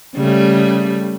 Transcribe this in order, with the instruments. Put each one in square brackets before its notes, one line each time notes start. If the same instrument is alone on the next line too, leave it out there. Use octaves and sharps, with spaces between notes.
[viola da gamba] C#3 G3 A3